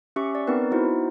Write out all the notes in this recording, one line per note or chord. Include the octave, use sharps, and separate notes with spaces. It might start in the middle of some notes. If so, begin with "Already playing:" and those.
C#4 G4 E5 C#6
D5
B3 C4 D#4 A#4 B4
B3 D#4 E4 F#4 C5